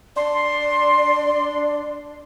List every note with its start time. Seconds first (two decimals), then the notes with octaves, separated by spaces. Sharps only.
0.16 D4 D5 C6